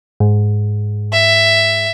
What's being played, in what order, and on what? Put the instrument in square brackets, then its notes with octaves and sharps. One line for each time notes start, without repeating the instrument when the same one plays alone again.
[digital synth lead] G#2
[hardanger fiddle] E5